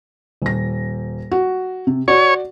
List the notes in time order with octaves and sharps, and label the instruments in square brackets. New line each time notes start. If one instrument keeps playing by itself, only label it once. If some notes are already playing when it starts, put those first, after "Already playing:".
[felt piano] D#1 A#6
F#4
C3
[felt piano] F#4 D5 [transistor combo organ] C#5